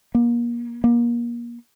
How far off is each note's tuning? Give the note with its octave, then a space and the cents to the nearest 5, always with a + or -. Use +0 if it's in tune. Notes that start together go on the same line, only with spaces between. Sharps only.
A#3 +30
A#3 +30